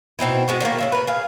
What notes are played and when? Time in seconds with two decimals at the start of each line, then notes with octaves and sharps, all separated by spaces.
0.19 B2 C4 D#4 E4
0.48 G#3 B3 F#4
0.61 D3 D#3 A3 A#3
0.79 C#3 F#3 E5
0.92 A#4 B4
1.07 G#4 F5